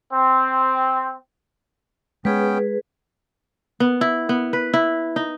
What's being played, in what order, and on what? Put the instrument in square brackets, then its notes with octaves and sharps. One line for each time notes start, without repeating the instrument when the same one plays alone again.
[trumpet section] C4
[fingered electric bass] G#3 [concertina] B3 C#4 G5 [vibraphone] G#4 B4
[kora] B3
E4
B3
B4
E4
D#4